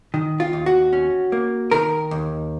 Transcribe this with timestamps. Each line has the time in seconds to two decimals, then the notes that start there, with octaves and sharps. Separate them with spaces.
0.14 D#3
0.40 F4
0.53 D#2
0.66 F#4
0.93 C#4
1.32 A#3
1.71 D#3 A#4
2.11 D#2